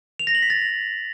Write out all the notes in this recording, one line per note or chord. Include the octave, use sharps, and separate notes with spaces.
F7
A#6
F#7
B6
A6